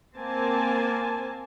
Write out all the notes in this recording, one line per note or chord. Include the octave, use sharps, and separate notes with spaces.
A#3 C4 G#5 A5